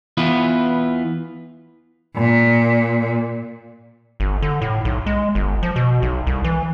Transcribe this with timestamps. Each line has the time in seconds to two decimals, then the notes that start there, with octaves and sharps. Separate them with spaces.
0.17 E3 B3 E4 F4 B4
2.16 A#2
4.20 G1
4.42 D3
4.62 A2
4.85 B1
5.06 G#3
5.35 G1
5.63 F3
5.76 B2
6.02 B1
6.27 C2
6.44 E3